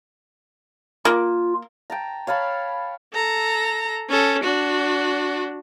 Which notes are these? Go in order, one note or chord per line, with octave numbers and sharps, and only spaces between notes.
A#3 F4
G5 A5 A#5
C#5 F5 A5 B5
A4 A#5
C#4 A4
D4 F#4